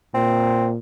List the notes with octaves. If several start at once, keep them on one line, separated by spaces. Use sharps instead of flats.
A#2 C4